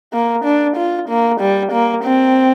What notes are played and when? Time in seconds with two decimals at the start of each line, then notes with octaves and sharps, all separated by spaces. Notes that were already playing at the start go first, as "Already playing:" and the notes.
0.13 A#3
0.45 D4
0.77 F4
1.09 A#3
1.40 G3
1.72 A#3
2.04 C4